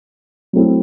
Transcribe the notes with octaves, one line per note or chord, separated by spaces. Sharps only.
F#3 A3 C4 E4